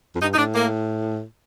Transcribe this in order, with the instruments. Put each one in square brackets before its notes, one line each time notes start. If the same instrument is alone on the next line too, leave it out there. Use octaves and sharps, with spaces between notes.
[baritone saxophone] F2
[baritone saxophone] G2 [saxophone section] D#4
[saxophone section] D#4
[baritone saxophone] A2 [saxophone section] D4
[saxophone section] A#3